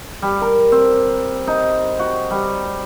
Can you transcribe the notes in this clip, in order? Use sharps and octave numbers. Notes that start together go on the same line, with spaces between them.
G3
A#4
C4
D#4
F#4
G3